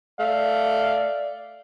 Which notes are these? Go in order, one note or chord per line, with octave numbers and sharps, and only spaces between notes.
A3 D5 F5